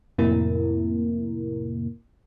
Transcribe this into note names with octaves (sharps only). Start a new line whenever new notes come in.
F2 A2 C3 A#3 E4 A#4